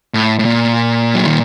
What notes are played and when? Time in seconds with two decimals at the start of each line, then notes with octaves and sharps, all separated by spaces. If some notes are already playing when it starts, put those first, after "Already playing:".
0.14 A2
0.39 A2
0.45 A#2
1.14 F#3
1.26 D#3